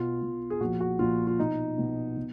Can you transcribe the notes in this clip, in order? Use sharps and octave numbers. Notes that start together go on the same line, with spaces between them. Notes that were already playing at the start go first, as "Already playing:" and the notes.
Already playing: B2 F4
B2
G#4
A#2 F3 F#4
F#4
A#2 F3 F4
F4
B2 D#4
B2
B2